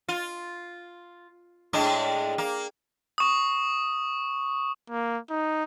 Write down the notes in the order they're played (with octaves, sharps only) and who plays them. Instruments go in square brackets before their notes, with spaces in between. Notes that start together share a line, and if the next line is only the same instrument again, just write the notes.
[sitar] F4
A2 G#3 D4
A#3
[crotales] C#6 D#6
[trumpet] A#3
D#4